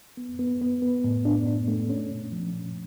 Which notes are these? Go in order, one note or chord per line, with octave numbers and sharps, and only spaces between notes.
B3
B3
B3
B3
A2
D4
D4
A3
C#4
A#2
F3
A#2